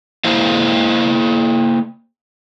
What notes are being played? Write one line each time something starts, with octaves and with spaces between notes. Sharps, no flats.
A#3 E4 C5 F5